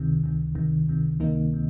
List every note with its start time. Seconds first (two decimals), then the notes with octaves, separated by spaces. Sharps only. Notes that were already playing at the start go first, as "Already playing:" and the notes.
Already playing: C#2 C3 D#3
0.23 C#2 C3 D#3
0.55 C#2 C3 D#3
0.88 C#2 C3 D#3
1.20 C#2 C3 D#3 A#3 D#4
1.53 C3